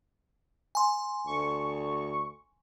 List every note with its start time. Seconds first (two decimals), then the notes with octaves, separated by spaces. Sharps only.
0.75 G#5 C6
1.27 D2 C#6